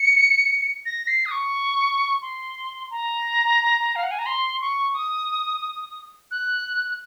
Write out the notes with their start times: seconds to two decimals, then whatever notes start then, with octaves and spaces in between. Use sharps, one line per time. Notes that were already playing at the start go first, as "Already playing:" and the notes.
Already playing: C#7
0.85 A#6
1.08 C7
1.26 D#6
1.31 C#6
2.22 C6
2.91 A#5
3.96 F5
4.03 F#5
4.11 G#5
4.19 A#5
4.26 C6
4.61 C#6
4.95 D#6
6.31 F#6